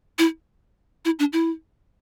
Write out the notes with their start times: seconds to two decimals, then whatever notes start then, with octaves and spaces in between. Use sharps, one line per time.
0.19 E4
1.05 E4
1.19 D4
1.33 E4